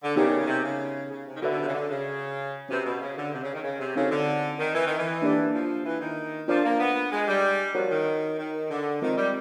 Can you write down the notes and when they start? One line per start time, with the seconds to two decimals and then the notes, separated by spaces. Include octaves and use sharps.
0.03 D3
0.16 C#3 B3 D#4 G4 A#4 D5
0.47 C3
0.64 C#3
1.10 C#3
1.27 C3
1.36 D#3
1.42 D3 F#4 B4 E5
1.52 B2
1.59 C3
1.67 C#3
1.74 D3
1.90 C#3
2.69 C3 C#4 F#4 B4
2.85 B2
3.01 C#3
3.17 D3
3.33 C3
3.43 C#3
3.54 D#3
3.64 C#3
3.80 C3
3.96 C#3 C4 D#4 F#4 A4 C5
4.11 D3
4.59 D#3
4.75 E3
4.87 D#3
4.98 E3
5.22 A#3 D4 G4 B4 D5
5.54 F3
5.85 E3
6.00 D#3
6.48 F3 D4 F4 A#4 D5
6.65 A#3
6.80 B3
7.12 G#3
7.28 G3
7.75 F3 F#4 A#4 C#5 F#5
7.91 D#3
8.38 D#3
8.70 D3
9.02 D#3 G#3 C4 F4 A#4 D#5
9.17 G3